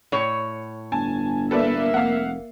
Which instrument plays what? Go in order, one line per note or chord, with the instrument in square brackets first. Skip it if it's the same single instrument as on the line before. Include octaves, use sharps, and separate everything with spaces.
[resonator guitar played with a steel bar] A2 C#5
[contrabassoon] G1 [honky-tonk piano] G#5 A5
[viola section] A#3 E5 [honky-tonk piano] A4 B4 D5
[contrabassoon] F1 [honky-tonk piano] F5 F#5